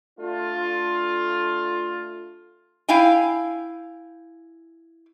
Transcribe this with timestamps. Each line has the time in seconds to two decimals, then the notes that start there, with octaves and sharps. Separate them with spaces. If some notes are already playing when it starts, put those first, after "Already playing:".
0.20 A3 D4 F4
2.89 E4 F5 G5 G#5